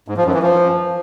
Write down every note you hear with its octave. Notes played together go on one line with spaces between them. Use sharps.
G#2
F3
F#2
E3
F3